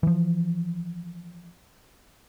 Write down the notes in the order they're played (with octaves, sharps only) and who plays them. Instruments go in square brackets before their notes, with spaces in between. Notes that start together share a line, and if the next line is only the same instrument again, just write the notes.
[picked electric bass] E3 F3